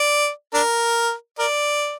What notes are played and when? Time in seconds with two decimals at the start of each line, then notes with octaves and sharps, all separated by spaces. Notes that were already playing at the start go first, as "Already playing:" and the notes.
Already playing: D5
0.54 D4 A#4
1.39 A#4 D5